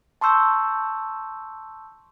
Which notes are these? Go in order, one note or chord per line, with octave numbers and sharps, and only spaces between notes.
A5 C6 C#6 E6 G6